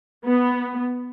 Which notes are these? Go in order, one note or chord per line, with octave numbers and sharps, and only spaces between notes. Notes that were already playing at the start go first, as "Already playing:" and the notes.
B3